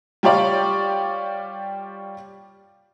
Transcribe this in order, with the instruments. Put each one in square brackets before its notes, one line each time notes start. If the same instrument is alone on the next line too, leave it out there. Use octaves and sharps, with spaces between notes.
[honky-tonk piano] G3 F4 G4 C#5 D5